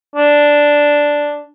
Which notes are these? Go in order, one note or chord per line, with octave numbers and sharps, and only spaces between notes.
D4